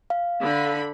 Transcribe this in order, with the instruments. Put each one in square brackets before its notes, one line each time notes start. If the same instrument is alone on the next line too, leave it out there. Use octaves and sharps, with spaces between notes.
[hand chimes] F5
[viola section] D3 B5